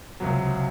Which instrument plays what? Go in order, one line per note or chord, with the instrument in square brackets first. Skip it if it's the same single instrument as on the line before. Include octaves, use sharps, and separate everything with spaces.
[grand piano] C#2 C3 F#3